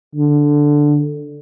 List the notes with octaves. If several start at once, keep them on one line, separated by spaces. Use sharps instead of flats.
D3